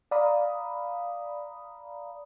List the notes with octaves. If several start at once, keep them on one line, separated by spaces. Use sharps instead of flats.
D5 F5 A#5 B5 D#6